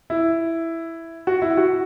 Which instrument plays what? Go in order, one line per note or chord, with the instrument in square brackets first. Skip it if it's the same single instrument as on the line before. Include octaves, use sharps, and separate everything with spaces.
[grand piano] E4
F#4
E4
F#4